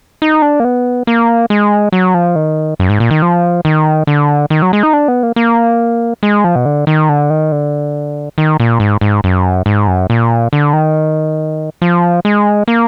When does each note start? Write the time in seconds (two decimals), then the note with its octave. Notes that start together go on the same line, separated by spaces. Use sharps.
0.22 D#4
0.42 D4
0.60 A#3
0.64 B3
1.07 A#3
1.50 G#3
1.92 F#3
2.14 F3
2.36 D#3
2.80 F#2
2.89 G#2
3.00 A#2
3.11 D#3
3.22 F3
3.65 D#3
4.07 D3
4.50 D#3
4.62 F#3
4.73 G#3
4.83 D#4
4.93 D4
5.08 B3
5.23 A#3
5.36 A#3
6.23 G#3
6.44 F3
6.56 B2
6.66 D3
6.87 D#3
7.09 D3
7.30 D#3
7.52 D3
8.38 D#3
8.60 A#2
8.80 G#2
9.01 G#2
9.24 F#2
9.66 G#2
9.87 F#2
10.10 A#2
10.53 D3
10.73 D#3
11.82 F3
12.25 G#3
12.68 A#3